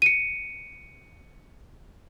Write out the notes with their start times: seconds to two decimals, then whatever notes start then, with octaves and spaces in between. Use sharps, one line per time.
0.02 C#7 D#7